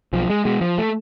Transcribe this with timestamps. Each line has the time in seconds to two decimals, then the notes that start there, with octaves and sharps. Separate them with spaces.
0.13 B1 F3
0.30 G#3
0.45 B2 G#3
0.61 F3
0.78 A3